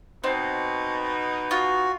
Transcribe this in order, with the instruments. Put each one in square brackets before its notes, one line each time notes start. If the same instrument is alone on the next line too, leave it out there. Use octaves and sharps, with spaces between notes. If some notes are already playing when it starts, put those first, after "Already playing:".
[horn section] B2 D#4 [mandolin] C4
[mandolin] F4 [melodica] F#4